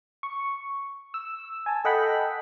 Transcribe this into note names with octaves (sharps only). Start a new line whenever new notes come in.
C#6
E6
G#5 A5
A4 D#5 F#5 G5 B5